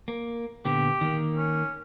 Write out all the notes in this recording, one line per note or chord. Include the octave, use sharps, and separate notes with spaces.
A#3
A#2 D3 B3 G4
D#3 A#3
C#4